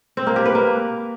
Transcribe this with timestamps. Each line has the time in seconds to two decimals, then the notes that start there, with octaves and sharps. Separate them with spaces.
0.17 C4
0.27 A#3
0.36 G4
0.45 B4
0.55 A#3